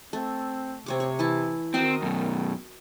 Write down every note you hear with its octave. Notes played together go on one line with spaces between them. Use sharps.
A3 C4
C3 C4 C#5 D6
C#5
E3 E4 A5
D#3 C4 F#4 A#4 D#5
F#2 B2